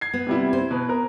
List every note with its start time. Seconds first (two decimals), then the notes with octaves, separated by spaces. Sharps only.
0.01 G#6 C7
0.14 B3
0.27 C3 G3 E4
0.53 C5
0.71 B2 B4
0.89 A#4